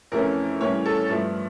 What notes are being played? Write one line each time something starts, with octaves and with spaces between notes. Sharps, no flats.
F2 E3 A3 C#4 A#4
A2 E3 G3 C#4 C#5
A4
G2 F3 A3